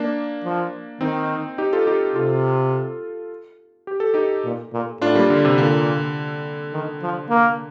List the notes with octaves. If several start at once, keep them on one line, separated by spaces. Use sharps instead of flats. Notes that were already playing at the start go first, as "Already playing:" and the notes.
Already playing: A#3 D4
F3
D#3 C4 D#4
D#4 G4
F4 A4
D#4 G4
C3 F4 A4
G4
A4
D#4 G4
A#2
A#2
A2 D4 F4
G3 A#3
D3
C3
A#2 D3
D#3
F3
A#3